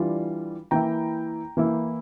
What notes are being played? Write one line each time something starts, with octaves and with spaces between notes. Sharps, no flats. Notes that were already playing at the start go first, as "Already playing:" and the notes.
Already playing: E3 G3 D4 F4
E3 A#3 E4 G5 A#5
E3 A#3 E4